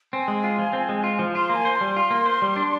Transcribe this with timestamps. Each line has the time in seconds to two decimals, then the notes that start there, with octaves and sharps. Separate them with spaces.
0.13 C4 G#5
0.28 G#3
0.44 F4
0.59 F3
0.73 C4
0.89 G#3
1.04 F4
1.19 F3
1.35 F4 C6
1.49 A#3
1.55 G#5
1.65 C5
1.75 C6
1.81 G3
1.96 F4
2.11 A#3
2.26 C5
2.42 G3
2.56 D4